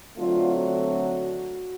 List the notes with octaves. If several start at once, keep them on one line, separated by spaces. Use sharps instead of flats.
D3 F#3 A3 C4 F4
F#4